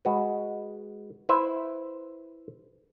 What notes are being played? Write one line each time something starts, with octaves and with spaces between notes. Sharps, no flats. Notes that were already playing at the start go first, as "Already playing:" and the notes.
G#3 F#4 B4
E4 B4 C5 E5